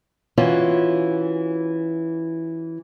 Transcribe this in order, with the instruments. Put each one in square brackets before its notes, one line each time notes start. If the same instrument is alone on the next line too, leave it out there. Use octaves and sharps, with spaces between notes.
[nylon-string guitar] E3 C#4 F4 F#4